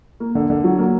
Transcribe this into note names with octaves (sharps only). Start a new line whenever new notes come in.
A#3
D3
D3
F#3
A#3